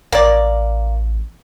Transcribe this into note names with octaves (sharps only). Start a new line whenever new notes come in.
A1 A#3 D5